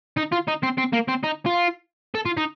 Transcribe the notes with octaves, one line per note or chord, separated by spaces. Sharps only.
D#4
F4
D#4
C4
C4
A#3
C4
D#4
F4
A4
F4
D#4